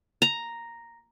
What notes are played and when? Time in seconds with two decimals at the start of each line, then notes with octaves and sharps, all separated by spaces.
0.22 A#5